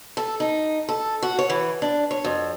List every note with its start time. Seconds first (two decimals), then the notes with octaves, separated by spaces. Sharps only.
0.17 A4
0.40 D#4
0.89 A4
1.22 F#4
1.39 C#5
1.50 E3
1.82 D4
2.11 C#5
2.24 F2